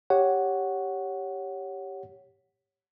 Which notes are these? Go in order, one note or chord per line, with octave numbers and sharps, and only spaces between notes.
G4 C#5 F#5